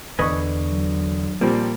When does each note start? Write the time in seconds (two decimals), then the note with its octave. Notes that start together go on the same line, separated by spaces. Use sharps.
0.19 E2 D3 B4 D#5 G#5 C#6
0.68 F#3
1.41 A#2 F3 G3 A#3 C4